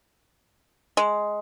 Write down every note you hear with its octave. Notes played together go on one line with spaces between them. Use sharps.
G#3